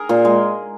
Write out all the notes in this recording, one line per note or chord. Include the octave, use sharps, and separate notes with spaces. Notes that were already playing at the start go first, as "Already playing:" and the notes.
Already playing: G#4 A#4
A#2
G#3